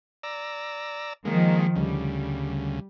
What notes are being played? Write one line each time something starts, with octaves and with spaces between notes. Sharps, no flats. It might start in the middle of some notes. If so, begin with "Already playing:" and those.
D5 A#5 E6
D#3 F3 G#3 A#3
D2 C#3 G3